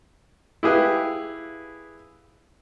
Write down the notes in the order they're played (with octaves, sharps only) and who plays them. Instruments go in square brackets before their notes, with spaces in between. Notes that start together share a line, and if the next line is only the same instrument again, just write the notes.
[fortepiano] E4 G4 G#4 B4 F5